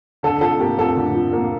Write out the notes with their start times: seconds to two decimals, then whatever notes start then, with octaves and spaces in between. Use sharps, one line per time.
0.23 D3 A4
0.41 F3 A4
0.60 A#3 G4
0.78 F2 A4
0.96 D3
1.15 F3
1.33 A#3